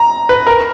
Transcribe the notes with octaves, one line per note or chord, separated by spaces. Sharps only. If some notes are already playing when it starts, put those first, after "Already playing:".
Already playing: A#5
B4
A#4